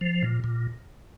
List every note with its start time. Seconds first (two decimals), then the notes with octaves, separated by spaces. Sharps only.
0.01 F3
0.23 A#2
0.44 A#2